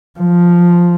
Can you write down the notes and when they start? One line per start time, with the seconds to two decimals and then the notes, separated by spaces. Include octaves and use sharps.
0.20 F3